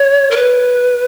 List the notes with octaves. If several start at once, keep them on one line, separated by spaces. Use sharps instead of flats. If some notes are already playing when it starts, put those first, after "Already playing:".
Already playing: C#5
A#4
B4